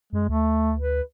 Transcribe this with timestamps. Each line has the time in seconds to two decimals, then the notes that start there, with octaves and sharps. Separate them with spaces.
0.13 F#2 G#3
0.29 D2 A3
0.79 B4